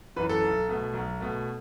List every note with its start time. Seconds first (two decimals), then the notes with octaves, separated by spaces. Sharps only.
0.16 F#2 E3 B4
0.29 A4
0.43 B1
0.69 B2 A3
0.94 B1
1.20 B2 A3